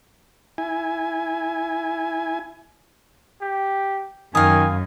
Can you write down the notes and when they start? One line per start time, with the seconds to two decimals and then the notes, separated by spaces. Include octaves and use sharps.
0.58 E4 G#5
3.41 G4
4.35 F#2 D#3 F5 G#5 D#6